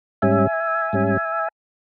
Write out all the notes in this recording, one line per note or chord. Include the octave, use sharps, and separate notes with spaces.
G#2 G3 C#4 E5 G#5
G#2 G3 C#4